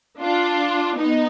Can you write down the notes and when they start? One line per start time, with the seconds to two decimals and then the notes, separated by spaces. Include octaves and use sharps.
0.21 D4 F4
0.97 B3 D#4